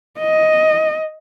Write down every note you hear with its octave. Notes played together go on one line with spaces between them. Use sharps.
D#5